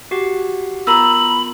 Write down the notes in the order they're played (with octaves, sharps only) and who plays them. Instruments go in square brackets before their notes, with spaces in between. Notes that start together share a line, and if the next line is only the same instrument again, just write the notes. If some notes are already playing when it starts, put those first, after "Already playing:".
[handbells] F#4 G4 F#5
[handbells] B3 F4 A#4 [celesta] A#5 E6 [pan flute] B5